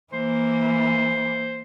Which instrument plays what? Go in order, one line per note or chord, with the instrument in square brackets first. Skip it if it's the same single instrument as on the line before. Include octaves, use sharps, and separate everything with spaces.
[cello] E3 A#3 [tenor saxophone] C5